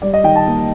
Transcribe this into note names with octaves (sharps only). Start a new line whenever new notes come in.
G3 D5
D#5
D#3 G5
A5
A#3